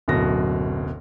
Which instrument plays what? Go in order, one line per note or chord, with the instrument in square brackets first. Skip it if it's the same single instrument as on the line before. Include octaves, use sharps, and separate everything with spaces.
[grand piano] D1 F#2 B2 A#6